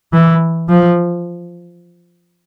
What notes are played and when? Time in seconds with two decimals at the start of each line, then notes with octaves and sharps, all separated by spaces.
0.13 E3
0.69 F3